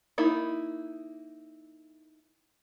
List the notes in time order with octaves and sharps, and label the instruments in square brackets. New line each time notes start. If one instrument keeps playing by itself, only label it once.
[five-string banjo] A#3 D#4 E4